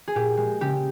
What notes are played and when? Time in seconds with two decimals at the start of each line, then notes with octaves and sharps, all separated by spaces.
0.08 G#4
0.15 A#2 G4
0.37 G#3
0.61 C#3 G4